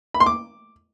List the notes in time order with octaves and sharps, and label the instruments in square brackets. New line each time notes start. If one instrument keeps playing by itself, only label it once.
[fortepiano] B5
C6
D6